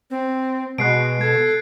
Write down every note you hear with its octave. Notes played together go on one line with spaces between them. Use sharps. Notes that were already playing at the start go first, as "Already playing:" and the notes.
C4
B2 G#3 F#6 C7 D7
A4 G#6